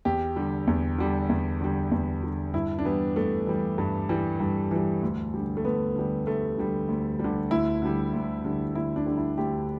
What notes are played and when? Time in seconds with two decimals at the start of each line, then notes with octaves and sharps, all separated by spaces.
0.05 E2 G4
0.36 D3 G3
0.67 E2
0.98 D3 G3
1.30 E2
1.61 D3 G3
1.92 E2
2.23 D3 G3
2.54 G2 E4
2.79 D4
2.85 E3 G3 B3
3.16 G2 A3
3.47 E3 G3
3.78 G2
4.09 E3 G3
4.40 G2
4.71 E3 G3
5.03 D2
5.34 D3 G3
5.57 A3
5.65 D2 B3
5.96 D3 G3
6.27 D2 A3
6.58 D3 G3
6.89 D2
7.19 D3 G3
7.51 D2 E4
7.82 D3 G3
8.13 D2
8.45 D3 G3
8.75 D2 E4
8.96 D4
9.06 D3 G3
9.17 E4
9.38 D2 G4